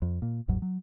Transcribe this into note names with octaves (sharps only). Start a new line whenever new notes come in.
F2
A#2
G1 D#2 G#2 F#3
F#3